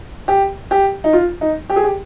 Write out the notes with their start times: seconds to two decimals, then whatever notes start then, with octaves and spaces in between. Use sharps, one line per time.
0.28 G4
0.71 G4
1.04 D#4
1.13 F4
1.41 D#4
1.70 G4
1.76 G#4
1.84 G4